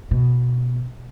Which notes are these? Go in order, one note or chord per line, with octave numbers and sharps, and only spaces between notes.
B2